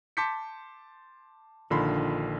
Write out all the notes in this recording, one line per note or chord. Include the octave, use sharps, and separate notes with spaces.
A5 C6 D6 G6 B6 C#7
A#1 D3 D#3 F4 B5 C6